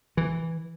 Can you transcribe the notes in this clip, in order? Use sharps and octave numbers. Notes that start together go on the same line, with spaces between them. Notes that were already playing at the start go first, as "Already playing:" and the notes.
E3